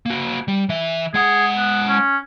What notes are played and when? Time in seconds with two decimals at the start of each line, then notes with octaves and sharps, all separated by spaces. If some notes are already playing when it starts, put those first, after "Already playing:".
0.06 A#3 F#4
0.48 G3
0.69 E3 E5
1.14 G#3 G#4 F#5
1.57 B3
1.88 C#4